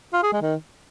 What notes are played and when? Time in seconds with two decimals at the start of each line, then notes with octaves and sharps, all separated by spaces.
0.14 F4
0.23 G#4
0.33 G#3
0.42 D#3